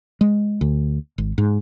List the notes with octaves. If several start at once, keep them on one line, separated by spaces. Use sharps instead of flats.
G#3
D2
G#1
G#2